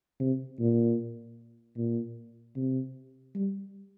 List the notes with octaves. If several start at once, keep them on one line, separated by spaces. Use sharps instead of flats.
C3
A#2
A#2
C3
G3